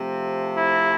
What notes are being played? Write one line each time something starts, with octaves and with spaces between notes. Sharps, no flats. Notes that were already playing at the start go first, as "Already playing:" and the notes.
Already playing: C3 F3 A3 C4
E4